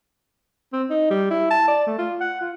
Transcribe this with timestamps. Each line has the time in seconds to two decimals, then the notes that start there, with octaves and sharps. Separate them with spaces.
0.73 C4
0.90 D#4
1.10 G3
1.30 E4
1.51 A5
1.68 D5
1.87 A3
1.98 F4
2.21 F#5
2.41 F4